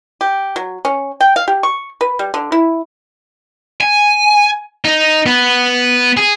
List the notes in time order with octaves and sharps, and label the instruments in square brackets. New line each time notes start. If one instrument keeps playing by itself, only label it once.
[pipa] G4
F#3
C#4
G5
F5
G4
C#6
B4
G3
D3
E4
[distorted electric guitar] G#5
D#4
B3
G#4